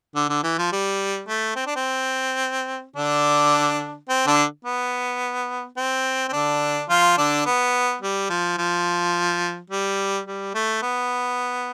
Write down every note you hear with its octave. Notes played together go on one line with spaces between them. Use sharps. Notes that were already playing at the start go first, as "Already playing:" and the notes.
D3
D3
E3
F3
G3
A3
C4
D4
C4
D3 D4
C4
D3 D4
B3
C4
C4
D3 D4
F3 F4
D3 D4
B3
G3
F3
F3
G3
G3
A3
B3